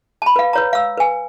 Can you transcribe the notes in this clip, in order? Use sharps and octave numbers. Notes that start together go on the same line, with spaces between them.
A5 B5
B4 F5
B4 C#5 A#5
F5 E6
B4 G#5